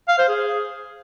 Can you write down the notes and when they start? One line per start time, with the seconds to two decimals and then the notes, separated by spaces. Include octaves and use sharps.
0.08 F5
0.18 C5
0.29 G#4